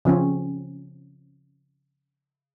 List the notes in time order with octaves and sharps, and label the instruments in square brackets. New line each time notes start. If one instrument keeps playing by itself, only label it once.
[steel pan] C#3 F3 C4 C#4